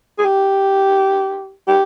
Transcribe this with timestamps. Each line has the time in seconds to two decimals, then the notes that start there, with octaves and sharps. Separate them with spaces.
0.19 G#4
0.25 G4
1.68 G4